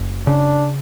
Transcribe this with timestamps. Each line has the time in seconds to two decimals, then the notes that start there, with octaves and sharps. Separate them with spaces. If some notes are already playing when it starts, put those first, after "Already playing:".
Already playing: F#1
0.27 C#3 D4